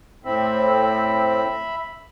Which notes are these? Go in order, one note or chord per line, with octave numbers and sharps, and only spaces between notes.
A2 C4 E5 B5